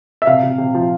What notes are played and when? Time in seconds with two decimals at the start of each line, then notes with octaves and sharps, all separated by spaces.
0.22 E5
0.27 C3 F5
0.43 C3
0.58 C3
0.74 F3